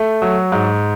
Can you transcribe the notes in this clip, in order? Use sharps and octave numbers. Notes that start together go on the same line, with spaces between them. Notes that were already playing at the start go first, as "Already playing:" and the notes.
Already playing: A3
F#3
G#2